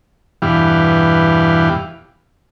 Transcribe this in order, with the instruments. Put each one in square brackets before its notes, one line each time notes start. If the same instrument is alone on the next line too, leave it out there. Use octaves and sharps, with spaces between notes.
[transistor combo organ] E2 G2 B2 E3 G4 F5